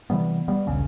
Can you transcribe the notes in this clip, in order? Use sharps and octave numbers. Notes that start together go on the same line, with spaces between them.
C3 E3 G3 B3
G3 B3
A#1 D#2 C#3